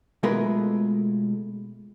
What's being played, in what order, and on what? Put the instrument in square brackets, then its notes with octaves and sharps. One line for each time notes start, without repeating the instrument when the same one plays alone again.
[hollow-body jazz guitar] B2 G#3 A3 F4 A#4 B4